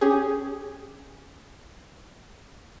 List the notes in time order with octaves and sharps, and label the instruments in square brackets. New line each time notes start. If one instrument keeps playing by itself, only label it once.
[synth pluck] C#4 G4 G#4